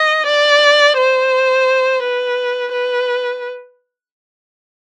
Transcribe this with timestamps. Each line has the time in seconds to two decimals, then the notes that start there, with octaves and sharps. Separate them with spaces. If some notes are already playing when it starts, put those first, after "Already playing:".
Already playing: D#5
0.26 D5
0.97 C5
2.03 B4
2.72 B4